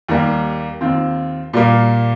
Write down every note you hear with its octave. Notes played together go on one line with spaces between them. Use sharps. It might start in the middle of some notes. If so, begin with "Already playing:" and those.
D#2 D#3 G3 A#3
D#2 D#3 C4 F4
A#2 G3 A#3